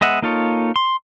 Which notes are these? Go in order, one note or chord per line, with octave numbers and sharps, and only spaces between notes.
G#3 B3 D#5 E5 F#5
A#3 D#4 F4 A4 C#5
C6